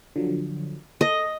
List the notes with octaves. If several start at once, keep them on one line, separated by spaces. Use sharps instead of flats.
D3 F3 F#3
A4 D#5